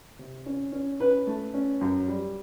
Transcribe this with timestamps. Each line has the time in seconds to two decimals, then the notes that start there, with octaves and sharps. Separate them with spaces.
0.19 C3
0.46 C#4
0.72 C#4
1.00 C#4 B4
1.27 A3
1.54 C#4
1.81 F#2
2.08 G3